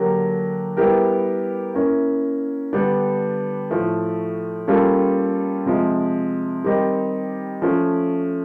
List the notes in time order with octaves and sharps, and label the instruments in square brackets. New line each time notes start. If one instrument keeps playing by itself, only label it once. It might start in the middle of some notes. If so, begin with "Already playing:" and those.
Already playing: [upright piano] D3 F#3 A#3 D4 G4
G3 B3 E4 G4 A#4
A#3 C#4 E4
D3 G3 B3 D4
A2 F3 A3
G3 A#3 C#4 F4 A4
C3 F3 G#3
D#3 G3 C4 D#4 G4
F3 A3 C#4